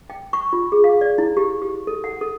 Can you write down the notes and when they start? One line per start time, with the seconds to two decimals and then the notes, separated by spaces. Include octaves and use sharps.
0.10 G5
0.33 C#6
0.53 F4
0.72 G#4
0.84 F5
1.01 D5
1.18 E4
1.37 G4
1.62 G4
1.87 A4
2.04 F#5
2.21 A4